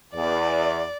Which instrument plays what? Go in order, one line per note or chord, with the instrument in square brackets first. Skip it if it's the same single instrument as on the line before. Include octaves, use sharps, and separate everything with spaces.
[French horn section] E2 [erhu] D5